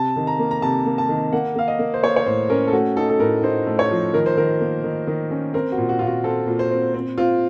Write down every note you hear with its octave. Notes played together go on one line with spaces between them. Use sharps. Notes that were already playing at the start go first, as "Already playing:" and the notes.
Already playing: C3 A5
D#3
A#5
A#3
A#5
C3 A5
A#3
A5
D#3
A#3 F#5
A#3 F5
D#5
A#3
C5
A#3 C#5
C#5
A2 C5
C#4 A#4
A4
A3 F#4
D#4 A4
A4
A2 A#4
D#4 C5
A3
C#5
F3
D#3 A#4
C5
D#3 A#4
A#3
D#3
D#3
C#4
C4 A#4
F#4
A#2
F#4
A#2 F4
F#4
C4 A4
A#2
C5
C4
C4
C4 F4